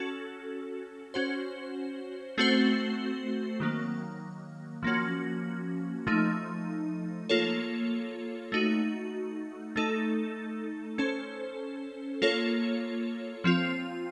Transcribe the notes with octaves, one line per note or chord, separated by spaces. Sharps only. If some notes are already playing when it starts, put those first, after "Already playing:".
Already playing: C#4 F#4 A4
C#4 F#4 C5
A3 C4 F#4 C5
D#3 F#3 A#3
F3 A#3 C#4 F#4
F3 A3 D#4
A#3 F4 A4 C#5
A3 D#4 F#4
A3 D#4 A4
C#4 A4 C5
A#3 F4 A4 C#5
F3 C4 F4